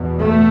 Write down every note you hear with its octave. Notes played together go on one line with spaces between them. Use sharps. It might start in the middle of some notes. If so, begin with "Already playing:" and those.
Already playing: E2 B2
A3